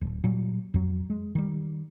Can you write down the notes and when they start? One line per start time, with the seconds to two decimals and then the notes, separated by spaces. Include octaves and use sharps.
0.01 D1
0.24 A#2 F#3 G3
0.74 F2 F#3
1.10 G#3
1.35 D#3 G3